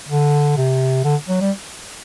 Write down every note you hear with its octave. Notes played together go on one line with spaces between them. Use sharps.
D3
C3
D3
F#3
G3